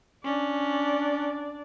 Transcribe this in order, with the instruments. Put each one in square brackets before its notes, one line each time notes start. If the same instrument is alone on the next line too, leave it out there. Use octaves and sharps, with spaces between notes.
[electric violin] C#4 [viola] D4 D5